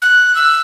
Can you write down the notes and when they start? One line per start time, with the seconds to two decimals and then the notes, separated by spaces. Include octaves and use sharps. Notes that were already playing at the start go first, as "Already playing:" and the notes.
0.02 F#6
0.35 E6